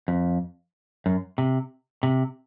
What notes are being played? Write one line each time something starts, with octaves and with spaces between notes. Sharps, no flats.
F2
F#2
C3
C3